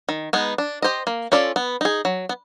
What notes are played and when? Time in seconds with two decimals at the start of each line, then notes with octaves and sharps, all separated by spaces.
0.09 D#3
0.33 G#3 B3 D#4
0.58 D4
0.82 G4 C5 D#5
1.07 A#3
1.32 C#4 F4 A4 D5
1.56 B3
1.81 D#4 G#4
2.05 F#3
2.29 B3